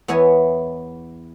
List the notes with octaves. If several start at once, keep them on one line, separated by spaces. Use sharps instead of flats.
E2 B3 C#5 E5 G#5